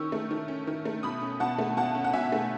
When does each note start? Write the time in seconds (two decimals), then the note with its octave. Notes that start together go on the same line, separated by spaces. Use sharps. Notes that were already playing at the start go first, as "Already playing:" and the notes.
Already playing: D#3 C#4 C#6 E6
0.12 A3
0.31 D#3
0.48 C#4
0.67 D#3
0.85 A3
1.03 B2 B5 D#6
1.22 C#4
1.40 B2 F#5 A5
1.59 A3
1.77 B2 F#5 A5
1.95 C#4
2.04 F#5
2.13 B2 E5 G#5
2.32 A3